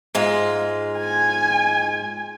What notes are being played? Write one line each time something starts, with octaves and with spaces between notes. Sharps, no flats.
G#2 G#3 F4
G#5